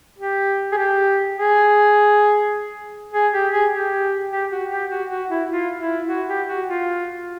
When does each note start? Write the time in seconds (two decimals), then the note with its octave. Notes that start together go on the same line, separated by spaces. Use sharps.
0.19 G4
0.72 G#4
0.77 G4
1.37 G#4
3.13 G#4
3.33 G4
3.52 G#4
3.72 G4
4.31 G4
4.51 F#4
4.70 G4
4.90 F#4
5.10 F#4
5.30 E4
5.49 F4
5.79 E4
6.08 F#4
6.28 G4
6.48 F#4
6.67 F4